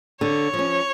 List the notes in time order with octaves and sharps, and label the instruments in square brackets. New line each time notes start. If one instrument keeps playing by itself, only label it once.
[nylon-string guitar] D3 [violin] C#5
[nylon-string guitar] F3
C#4